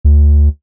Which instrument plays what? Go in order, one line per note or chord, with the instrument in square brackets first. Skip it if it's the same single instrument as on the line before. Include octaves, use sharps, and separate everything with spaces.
[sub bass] D2